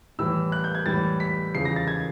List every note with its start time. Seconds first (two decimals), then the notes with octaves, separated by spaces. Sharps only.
0.19 A2 E3 G3 E6
0.52 F#6
0.64 G6
0.75 G#6
0.86 A2 E3 G3 A6
1.20 B6
1.54 E2 C#3 F3 C7
1.65 A#6
1.76 A6
1.88 G#6